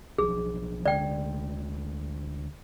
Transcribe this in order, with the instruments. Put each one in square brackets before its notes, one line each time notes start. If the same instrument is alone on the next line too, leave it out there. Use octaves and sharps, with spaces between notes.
[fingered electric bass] B1 F3 [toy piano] G#4
[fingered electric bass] D2 D3 G#3 [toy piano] D5 G5